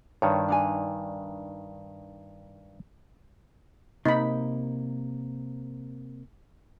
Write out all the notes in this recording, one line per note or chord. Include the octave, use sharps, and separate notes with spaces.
G2 D#3 C#5
D4 D#4 G#5
C3 A#3 D#4 B5